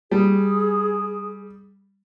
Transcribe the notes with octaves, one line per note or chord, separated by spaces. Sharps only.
G3 G#4